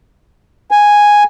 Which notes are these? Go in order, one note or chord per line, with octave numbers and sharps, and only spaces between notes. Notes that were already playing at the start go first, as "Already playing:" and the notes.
G#5